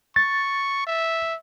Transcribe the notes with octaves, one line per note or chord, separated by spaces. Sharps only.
C#6 A6
E5